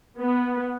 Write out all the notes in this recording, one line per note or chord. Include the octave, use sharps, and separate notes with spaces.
B3